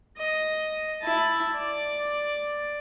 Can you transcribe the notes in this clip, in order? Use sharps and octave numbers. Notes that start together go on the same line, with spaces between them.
D#5
E4 A5
D5